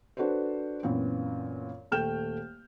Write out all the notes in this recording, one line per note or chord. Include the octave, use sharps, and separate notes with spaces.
D4 F#4 A4 B4 C5
F#2 A#2 E3 B3 C4
D#1 A3 G5 F6 G6 E7